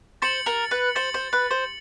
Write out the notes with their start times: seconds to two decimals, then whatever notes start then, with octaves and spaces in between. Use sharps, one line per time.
0.22 C5 A6 C#7 F#7
0.46 A#4
0.71 B4
0.95 C5 A6 C#7 F#7
1.14 C5
1.33 B4
1.51 C5